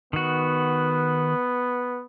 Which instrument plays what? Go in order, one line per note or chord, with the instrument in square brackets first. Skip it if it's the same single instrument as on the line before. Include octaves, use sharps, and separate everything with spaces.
[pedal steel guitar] D#3 F#4 [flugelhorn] B3